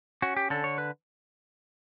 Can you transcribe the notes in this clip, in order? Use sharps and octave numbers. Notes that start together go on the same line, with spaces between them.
C#4 F#4
G4
D3 A4
C#5
B4